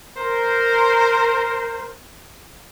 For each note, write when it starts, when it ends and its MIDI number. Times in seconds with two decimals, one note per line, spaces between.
0.17 1.90 70
0.17 1.90 72